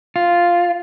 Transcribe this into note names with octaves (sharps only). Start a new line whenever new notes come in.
F4